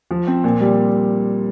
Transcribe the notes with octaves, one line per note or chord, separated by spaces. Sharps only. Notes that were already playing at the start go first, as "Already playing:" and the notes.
F3
C4
A#2
G3